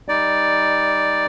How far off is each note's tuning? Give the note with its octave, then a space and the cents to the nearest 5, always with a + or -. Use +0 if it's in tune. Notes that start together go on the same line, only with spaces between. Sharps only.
G3 +10 D#4 +5 D5 +0